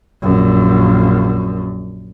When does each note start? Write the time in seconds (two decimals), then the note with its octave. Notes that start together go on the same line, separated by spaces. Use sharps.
0.22 A#1 F#2